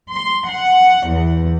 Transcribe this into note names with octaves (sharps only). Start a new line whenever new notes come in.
C6
F#5
E2